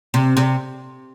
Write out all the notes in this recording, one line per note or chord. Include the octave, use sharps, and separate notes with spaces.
C3
C3